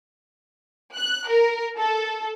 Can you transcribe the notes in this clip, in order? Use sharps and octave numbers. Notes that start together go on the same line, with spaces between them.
F#6
A#4
A4